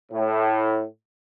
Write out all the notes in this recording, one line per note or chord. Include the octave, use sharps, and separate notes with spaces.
A2